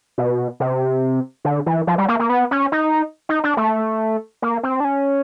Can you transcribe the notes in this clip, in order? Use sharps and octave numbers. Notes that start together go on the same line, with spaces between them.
B2
C3
D3
E3
F3
G3
A#3
A#3
B3
C#4
D#4
D#4
D4
A3
A#3
C4
D4
C#4